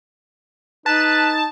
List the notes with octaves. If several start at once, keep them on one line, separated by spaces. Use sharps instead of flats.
D#4 B4 A5